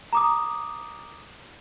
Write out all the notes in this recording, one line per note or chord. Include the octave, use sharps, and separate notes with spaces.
A#5 D6 D#6